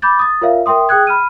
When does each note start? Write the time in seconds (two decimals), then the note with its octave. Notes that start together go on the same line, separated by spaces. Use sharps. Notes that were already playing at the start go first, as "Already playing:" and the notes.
0.02 B5 D6 G6 A6
0.19 D#6 A6
0.41 F4 A#4 C#5 E5 F5
0.66 A#4 E5 G5 C6 D#6
0.89 G#4 G5 D#6 F#6 G#6
1.07 B5 F6 D#7